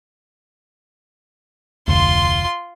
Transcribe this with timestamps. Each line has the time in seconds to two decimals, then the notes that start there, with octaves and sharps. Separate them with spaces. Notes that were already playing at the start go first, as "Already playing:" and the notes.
1.88 F1 D2 F4 C6